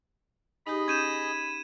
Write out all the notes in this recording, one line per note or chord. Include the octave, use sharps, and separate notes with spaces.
D#4 G4 G#4 D#5 B5
C#4 G6 G#6 D#7 E7